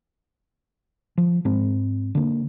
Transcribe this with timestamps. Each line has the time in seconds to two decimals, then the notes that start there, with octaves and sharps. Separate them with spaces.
1.18 F3
1.45 G#2 G#3 C4
2.15 D3 A#3